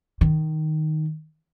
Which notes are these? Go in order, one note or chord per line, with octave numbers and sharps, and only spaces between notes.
D#3